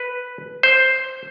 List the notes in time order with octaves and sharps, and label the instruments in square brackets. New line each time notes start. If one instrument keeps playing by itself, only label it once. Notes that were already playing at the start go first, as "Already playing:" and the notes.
Already playing: [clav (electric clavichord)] B4
C5